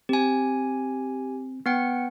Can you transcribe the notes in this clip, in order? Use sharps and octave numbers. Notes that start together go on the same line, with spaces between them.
C4 G4 G#5
B3 F#5 G5